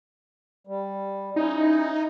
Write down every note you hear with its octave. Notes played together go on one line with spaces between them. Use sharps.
G3
C#4 D#4 E4